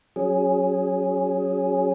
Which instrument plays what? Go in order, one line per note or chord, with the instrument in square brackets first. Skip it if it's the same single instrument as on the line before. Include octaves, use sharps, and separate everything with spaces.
[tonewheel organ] F#3 C#4 G#4